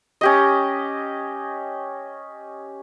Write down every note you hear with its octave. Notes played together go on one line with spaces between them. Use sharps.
C#4 G4 D#5